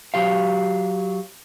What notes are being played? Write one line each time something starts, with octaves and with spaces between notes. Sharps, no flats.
F#3 G4 F5